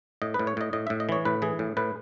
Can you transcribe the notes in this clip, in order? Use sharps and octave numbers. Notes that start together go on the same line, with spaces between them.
A2 D#5
B4
A2
C#5
A2 D#5
A2 D#5
A2 E5
D#5
E3 C#5
A2 B4
E3 G#4
A2
A2 B4